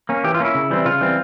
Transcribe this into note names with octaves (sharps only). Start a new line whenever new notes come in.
A#3 C#4
E3 G4
F4
A#3 C#4 E4
C#3
E3 G3 C4
C#3 F4
E3 G3 C4